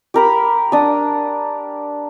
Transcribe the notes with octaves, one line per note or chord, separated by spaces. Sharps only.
G4 A#4 B5
D4 D#6